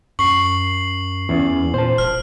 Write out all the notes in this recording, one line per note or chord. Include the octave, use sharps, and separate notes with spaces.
F#2 C#6 C7 F#7
E2 C#4
A#2 C5 A5
E1 F6